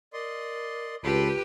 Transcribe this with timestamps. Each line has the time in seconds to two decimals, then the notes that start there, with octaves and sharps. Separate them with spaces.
0.13 A#4 D5 D#5 C6
1.04 C#2 F4 G4 A4 B4 B5 C6